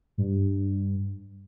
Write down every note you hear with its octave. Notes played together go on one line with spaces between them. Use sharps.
G2